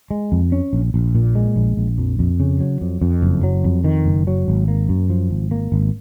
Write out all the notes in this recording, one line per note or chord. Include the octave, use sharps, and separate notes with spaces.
G#3
F2
C#4
A#1
A#1
A#2
G#3
A#1
A#1
F2
F2
C#3
F#3
F2
F2
F#1
F#3
F2
D#3
F#1
F#3
G#1
A#3
F#2
F3
G#1
A#3
G#1